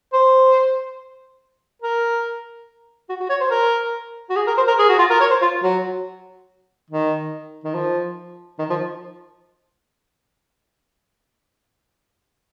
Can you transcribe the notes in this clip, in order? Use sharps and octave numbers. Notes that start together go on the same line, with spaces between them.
C5
A#4
F#4
F#4
C#5
C5
A#4
F#4
G#4
A#4
C5
A#4
G#4
F#4
F4
A#4
C#5
C5
F4
F#3
D#3
D#3
F3
D#3
F3